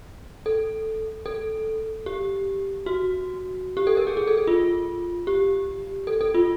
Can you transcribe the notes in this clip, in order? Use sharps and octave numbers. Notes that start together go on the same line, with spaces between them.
A4
A4
G4
F#4
G4
A4
A#4
G#4
G#4
A4
A4
F4
G4
A4
A4
F4